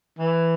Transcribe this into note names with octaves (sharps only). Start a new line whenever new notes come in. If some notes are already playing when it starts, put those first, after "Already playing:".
E3